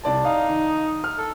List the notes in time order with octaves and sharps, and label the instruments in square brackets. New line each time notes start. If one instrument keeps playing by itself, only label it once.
[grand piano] C2 D5 A5
[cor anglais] D#4 [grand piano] F5
[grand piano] D#3
F6
[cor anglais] A4